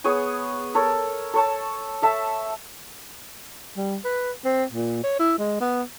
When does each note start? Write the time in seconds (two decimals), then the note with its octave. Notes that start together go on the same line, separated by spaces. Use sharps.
0.04 B3 G#4 C#5 G#5
0.75 A4 A#4 C#5
1.34 A4 C#5 A5
2.02 A4 E5 A5
3.77 G3
4.05 B4
4.45 C4
4.73 A#2
5.03 C#5
5.19 E4
5.39 G#3
5.61 B3